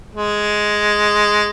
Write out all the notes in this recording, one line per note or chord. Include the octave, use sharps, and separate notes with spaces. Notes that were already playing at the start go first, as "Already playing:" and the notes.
G#3